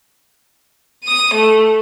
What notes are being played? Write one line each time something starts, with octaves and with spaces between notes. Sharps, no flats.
D#6 D#7
A3